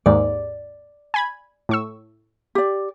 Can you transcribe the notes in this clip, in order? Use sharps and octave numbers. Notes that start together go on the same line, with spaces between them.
D#2 G#2 D5
G#5 B5 G#6
A2 C#6 E6
G4 D5